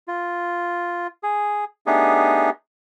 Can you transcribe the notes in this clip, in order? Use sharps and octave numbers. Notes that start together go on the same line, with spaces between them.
F4
G#4
A3 B3 D4 D#4 G4 G#4